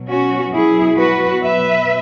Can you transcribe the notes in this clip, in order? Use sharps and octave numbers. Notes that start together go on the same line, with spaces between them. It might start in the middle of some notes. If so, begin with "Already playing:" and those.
Already playing: B2 F#3
C#4 F#4
E4 G#4
F#4 B4
B4 E5